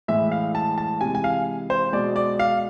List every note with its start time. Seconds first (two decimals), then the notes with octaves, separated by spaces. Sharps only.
0.08 A2 E3 G#3 E5
0.32 F5
0.55 A5
0.78 A5
1.01 C3 E3 G#3 G#5
1.15 G#5
1.24 F5
1.70 C5
1.93 B2 G#3 D5
2.16 D5
2.39 F5